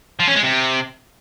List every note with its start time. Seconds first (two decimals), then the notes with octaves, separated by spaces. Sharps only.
0.20 F3
0.27 C#4
0.35 G#3
0.43 C3